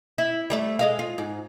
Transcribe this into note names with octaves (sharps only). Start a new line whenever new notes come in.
E4
G3 A3 D5
G#3 D#5 F5
F4
G#2